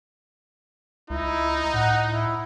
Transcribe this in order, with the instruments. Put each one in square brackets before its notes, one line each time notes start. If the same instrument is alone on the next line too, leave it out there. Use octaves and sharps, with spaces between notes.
[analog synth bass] C#2 [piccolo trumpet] D#4 [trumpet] E4
[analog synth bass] A2 [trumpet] F#5
[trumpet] E4